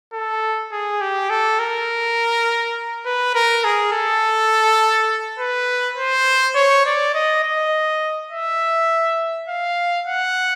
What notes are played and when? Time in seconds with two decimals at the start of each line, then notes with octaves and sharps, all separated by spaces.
0.13 A4
0.72 G#4
1.01 G4
1.30 A4
1.59 A#4
3.06 B4
3.34 A#4
3.64 G#4
3.92 A4
5.39 B4
5.98 C5
6.55 C#5
6.86 D5
7.14 D#5
7.43 D#5
8.31 E5
9.48 F5
10.07 F#5